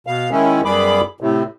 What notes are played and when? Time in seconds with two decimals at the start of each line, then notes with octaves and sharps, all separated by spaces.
0.07 B2 F5
0.31 D#3 G#3 C#4 E4
0.65 F#2 G3 B3 G#4 B5 D6
1.21 A2 C3